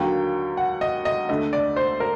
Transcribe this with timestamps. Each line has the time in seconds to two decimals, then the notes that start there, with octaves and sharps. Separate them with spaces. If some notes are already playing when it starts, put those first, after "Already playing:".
Already playing: D#2 D3 F#3 A#3 G5
0.57 F#5
0.81 D#5
1.05 D#5
1.29 D2 D3 A3 D#5
1.53 D5
1.76 C5
2.00 A#4